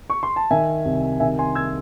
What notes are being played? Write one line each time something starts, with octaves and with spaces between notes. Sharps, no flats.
C#6
C6
A5
D#3 E5 G#5
C2
D#3 E5 G#5
G#5 C6
E6 G#6